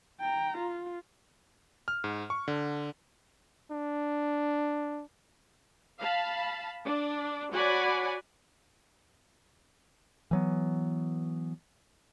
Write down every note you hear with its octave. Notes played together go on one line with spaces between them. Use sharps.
G5 A#5
F4
F6
G#2
C#6
D3
D4
F5 A5 B5
D4 D5
F#4 C#5 D5 F#5 G#5 B5
E3 F#3 B3